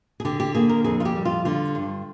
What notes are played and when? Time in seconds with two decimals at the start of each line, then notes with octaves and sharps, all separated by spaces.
0.20 G#4
0.25 D3 G4
0.40 G4
0.55 A#3 G#4
0.69 A#4
0.84 F2 G#4
1.00 F4
1.05 G4
1.16 G3
1.25 F4
1.45 D3 F4
1.75 G2